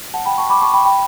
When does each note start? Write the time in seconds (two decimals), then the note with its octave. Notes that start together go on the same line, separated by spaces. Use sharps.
0.14 F#5 A5
0.26 G5 B5
0.38 A5 C#6
0.50 B5 D6
0.62 A5 C#6
0.73 G5 B5
0.85 G5 B5